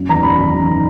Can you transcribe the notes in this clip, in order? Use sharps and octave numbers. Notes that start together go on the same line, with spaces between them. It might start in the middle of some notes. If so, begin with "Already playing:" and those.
Already playing: F#1
E2 D#3 A#5
F#1 B5
E2 D#3
F#1
D#3